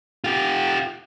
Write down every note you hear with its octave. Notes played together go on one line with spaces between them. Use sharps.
F4 G4